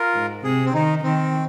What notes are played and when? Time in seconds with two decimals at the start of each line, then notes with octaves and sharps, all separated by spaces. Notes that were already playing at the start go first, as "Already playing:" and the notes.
Already playing: F4 A#4
0.15 G#2
0.44 C3 G#4
0.66 C4
0.74 D#3 D#4
1.03 D#3 C4